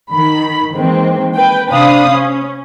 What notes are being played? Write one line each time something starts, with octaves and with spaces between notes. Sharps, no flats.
D#3 B5
D#3 E3 G#3 A#3 C4
B4 G5
C3 D4 C5 F5 B5 D#6
C#4